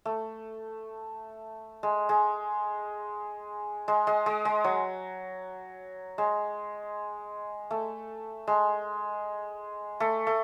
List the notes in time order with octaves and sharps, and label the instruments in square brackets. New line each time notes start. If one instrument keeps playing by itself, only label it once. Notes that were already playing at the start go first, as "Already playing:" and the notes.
[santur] A3
G#3
G#3
G#3
G#3
G#3
G#3
F#3
G#3
A3
G#3
A3
A3